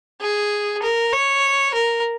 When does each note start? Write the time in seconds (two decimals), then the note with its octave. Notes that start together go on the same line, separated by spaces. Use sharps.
0.21 G#4
0.83 A#4
1.13 C#5
1.74 A#4